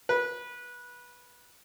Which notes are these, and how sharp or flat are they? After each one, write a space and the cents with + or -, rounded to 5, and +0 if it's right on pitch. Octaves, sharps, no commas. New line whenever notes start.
B4 -20